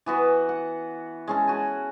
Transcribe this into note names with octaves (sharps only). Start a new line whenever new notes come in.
E3 B3 F#4 B4
F#5
G#3 C#4 A4
F#4 G#5